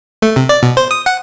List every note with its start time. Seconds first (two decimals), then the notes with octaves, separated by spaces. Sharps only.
0.22 A3
0.36 C3
0.49 D5
0.63 B2
0.77 C5
0.91 D#6
1.06 F#5